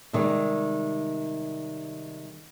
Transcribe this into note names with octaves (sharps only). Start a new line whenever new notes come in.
C3 D#3 G3 G#3